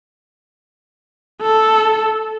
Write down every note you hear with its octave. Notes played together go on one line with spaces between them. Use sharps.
A4